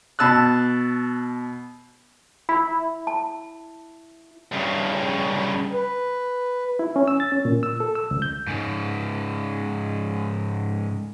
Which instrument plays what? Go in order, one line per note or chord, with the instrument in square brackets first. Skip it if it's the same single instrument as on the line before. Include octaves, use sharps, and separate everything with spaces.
[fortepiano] B2 A5 E6 F#6
[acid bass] E4 [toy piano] B5
[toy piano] A5
[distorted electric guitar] G2 C#3
[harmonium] B4
[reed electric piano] E4
C#4
E6
A6
C#4
A#2
E6
A4
E6
C#2
G6
[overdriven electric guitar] G#2 C#3